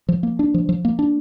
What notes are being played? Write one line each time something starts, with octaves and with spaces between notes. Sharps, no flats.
F3
A#3
D4
F3
F3
A#3
D4